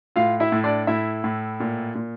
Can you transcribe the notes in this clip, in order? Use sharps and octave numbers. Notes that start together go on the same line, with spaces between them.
A2 F4 F5
E4 E5
A2
D4 D5
A2 E4 E5
A2
A#2
A#2